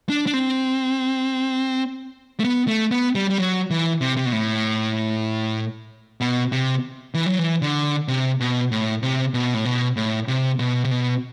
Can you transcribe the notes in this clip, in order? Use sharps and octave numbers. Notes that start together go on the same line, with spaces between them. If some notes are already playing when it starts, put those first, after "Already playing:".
D4
D4
C4
A3
B3
A3
B3
G3
G3
F#3
E3
C3
C3
B2
A2
B2
C3
E3
F#3
E3
D3
C3
B2
A2
C3
B2
A2
B2
A2
C3
B2
C3
B2